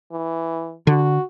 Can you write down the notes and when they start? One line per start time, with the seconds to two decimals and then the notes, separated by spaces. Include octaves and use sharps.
0.12 E3
0.87 D3 F#4